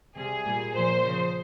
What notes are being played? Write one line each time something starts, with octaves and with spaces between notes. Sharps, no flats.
C3 G3 G#4
A#2 G3
A#2 F3 C5
C#3 F3